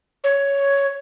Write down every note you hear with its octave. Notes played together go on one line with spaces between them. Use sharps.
C#5